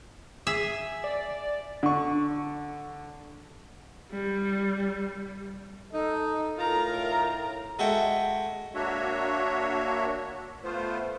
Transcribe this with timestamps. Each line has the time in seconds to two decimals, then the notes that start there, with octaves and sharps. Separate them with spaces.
0.47 G#4 E5
1.04 D5
1.83 D3 C#6
4.11 G3
5.93 D#4 A4 D#5
6.57 A2 D#4 F4 A#4 A#5
7.79 G#3 F#4 A4 E5 F#5 G5
8.75 A#3 D4 F#4 C#5 E5
10.64 A3 B3 F4 C5